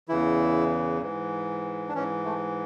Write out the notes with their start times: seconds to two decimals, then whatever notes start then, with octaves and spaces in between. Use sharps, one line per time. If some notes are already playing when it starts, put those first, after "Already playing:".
0.09 E2 C#3 E3 E4
1.02 G#2 E3
1.88 D4
1.94 G#2 E3 C#4
2.24 A3